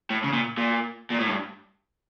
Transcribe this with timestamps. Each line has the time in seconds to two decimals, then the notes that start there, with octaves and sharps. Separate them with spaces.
0.10 A2
0.24 C#3
0.33 A#2
0.57 A#2
1.10 A#2
1.19 A2
1.28 G2